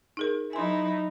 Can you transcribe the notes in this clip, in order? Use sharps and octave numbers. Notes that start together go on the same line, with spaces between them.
D#4 G#4 A#4
F#3 D#4 E4 G#5 C6